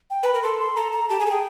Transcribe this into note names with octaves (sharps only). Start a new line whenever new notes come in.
G5
B4 B5
A#4
A4 C6
C6
A4 A#5
A#5
G4 A5
G#4 G#5
A4
G#4 G5